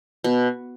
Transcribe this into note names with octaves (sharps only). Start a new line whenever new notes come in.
B2